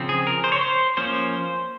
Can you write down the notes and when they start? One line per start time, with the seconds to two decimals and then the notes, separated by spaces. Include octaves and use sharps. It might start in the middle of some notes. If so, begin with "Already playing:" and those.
Already playing: C#3 F3 C4
0.09 G#4
0.27 A#4
0.44 C5
0.52 C#5
0.61 C5
0.97 F3 A#3 C#4 C5